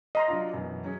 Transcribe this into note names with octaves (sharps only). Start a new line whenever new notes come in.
D#5 A#5 C6
F#3 D4 F4
F#2 B2 E3
F#3 C#4 G#4